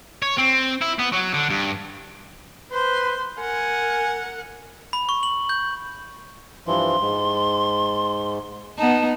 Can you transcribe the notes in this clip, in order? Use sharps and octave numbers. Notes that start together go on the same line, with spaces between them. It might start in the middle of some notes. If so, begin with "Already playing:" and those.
C#5
C4
E4
B3
F#3
D3
G2
B4 C5 C6
A#4 F#5 G#5
B5
C#6
F#7
G6
G2 E3 F3 C6
G#2
B3 D#4 A5